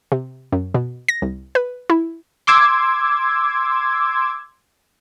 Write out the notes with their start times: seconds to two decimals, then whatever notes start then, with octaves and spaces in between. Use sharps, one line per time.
0.12 C3
0.52 F#2
0.74 B2
1.08 A#6
1.22 C2
1.55 B4
1.90 E4
2.47 C6 D6 E6 G#6